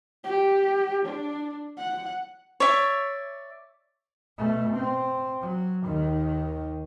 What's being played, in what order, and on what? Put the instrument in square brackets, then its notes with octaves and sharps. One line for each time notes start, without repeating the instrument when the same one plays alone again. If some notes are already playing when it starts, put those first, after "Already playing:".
[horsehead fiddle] G4
D4
F#5
[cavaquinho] C#5 D5 E5
[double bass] B2 A3
C4
F#3
D#2 D#3